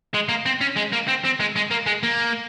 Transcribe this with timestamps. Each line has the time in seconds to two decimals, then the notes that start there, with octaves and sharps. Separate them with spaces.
0.14 G#3
0.29 A#3
0.46 C4
0.61 C#4
0.76 G#3
0.92 A#3
1.08 C4
1.24 C4
1.40 G#3
1.56 G#3
1.71 A#3
1.87 G#3
2.03 A#3